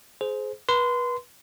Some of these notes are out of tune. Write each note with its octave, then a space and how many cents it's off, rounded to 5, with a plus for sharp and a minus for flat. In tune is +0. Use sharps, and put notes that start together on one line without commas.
G#4 +25 C5 -10
B4 -30 C6 -25